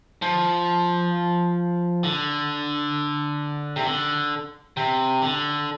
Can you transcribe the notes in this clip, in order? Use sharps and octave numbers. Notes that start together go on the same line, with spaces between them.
F3
D3
C3
D3
C3
D3